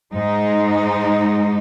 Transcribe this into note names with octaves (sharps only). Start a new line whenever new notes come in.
G#2 G#3 D#4